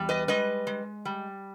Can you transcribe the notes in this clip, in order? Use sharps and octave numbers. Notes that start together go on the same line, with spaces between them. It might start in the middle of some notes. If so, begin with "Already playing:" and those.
Already playing: E2 G3
B4 D#5
G#3 B4 D#5
G#3
G3